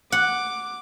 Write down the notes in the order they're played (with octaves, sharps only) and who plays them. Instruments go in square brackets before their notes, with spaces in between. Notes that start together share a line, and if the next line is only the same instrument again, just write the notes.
[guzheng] F#5 [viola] D6